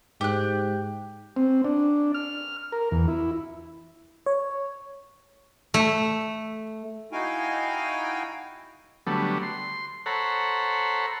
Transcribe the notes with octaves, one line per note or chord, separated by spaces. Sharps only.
G#2 G4 F#6
C4
D4
F6
A#4
E2
E4
C#5
A3
D#4 E4 F#4 F5 G5 G#5
D3 F#3 G3 A3 B3
C6
A4 C5 C#5 F#5 A#5 B5